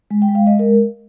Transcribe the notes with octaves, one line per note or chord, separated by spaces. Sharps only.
G#3
G5
G#3
F5
G#3 D#5
A#4